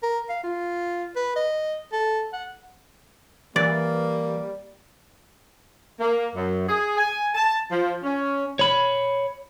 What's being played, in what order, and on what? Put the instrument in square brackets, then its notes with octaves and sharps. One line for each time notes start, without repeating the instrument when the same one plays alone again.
[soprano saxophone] A#4
F5
F4
B4
D#5
A4
F#5
[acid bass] E3 [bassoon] G3 [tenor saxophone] A#3 [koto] D5
[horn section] A#3
F#2
G#4
G#5
A5
F3
C#4
[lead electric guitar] C#5 B5